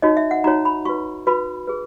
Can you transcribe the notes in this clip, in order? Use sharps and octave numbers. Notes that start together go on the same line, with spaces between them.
D#4 F#4 C#5 D#5
E5
F#5
D#4 F#4 C#5 A#5
B5
F#4 B4 C#6
F#4 B4 B5
G#4 B4